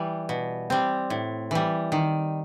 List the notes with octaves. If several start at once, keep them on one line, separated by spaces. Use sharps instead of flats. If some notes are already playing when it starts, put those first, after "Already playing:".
Already playing: E3 G3
B2
G3 C4
A2
E3 G3
D#3